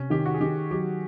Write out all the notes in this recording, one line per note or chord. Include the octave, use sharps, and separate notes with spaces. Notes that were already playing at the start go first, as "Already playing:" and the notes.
Already playing: C3 C#4
D#3 G4
F#4
G#4
D#3 G4
F#3 G4